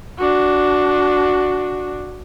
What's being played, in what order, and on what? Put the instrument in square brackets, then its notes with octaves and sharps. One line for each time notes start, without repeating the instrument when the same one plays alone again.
[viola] D4 F#4